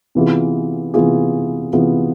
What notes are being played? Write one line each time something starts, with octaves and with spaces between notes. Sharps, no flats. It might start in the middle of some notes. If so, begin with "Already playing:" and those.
C3 E3 B3 F4 G#4
C3 E3 B3 F4 G#4
C3 E3 B3 F4 G#4